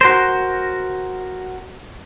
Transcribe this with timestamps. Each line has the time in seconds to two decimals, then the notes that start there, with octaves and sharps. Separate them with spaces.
0.01 F#4 A#4 C5